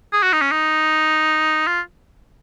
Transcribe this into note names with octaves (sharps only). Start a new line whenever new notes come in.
G#4
F#4
D#4
C#4
D#4
F4